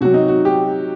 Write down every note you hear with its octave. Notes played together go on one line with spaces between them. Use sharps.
C3 F#3 F#4
D#4
F#4
G4